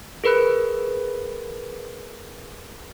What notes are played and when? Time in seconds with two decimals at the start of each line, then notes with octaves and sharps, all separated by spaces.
0.24 G#4 A#4 B4 B5 F#6